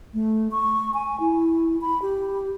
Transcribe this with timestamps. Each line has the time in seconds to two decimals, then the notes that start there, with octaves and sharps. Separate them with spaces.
0.14 A3
0.51 C#6
0.94 G#5
1.20 E4
1.81 B5
2.02 G4